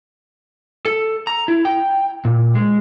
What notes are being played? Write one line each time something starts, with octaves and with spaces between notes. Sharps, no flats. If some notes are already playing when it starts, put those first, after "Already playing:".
A4
A#5
E4
G5
A#2
G#3